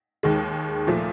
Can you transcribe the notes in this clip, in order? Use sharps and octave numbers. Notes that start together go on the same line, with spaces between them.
D#2 D#3 G#3
A#2 F3 A3